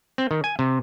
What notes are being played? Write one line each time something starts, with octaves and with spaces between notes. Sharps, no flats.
C4
D#3
G#5
C3